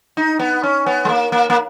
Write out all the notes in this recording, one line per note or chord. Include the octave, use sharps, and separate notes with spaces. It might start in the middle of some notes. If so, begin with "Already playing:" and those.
D#4
B3
C#4
B3
G#3
A#3
A#3
A#3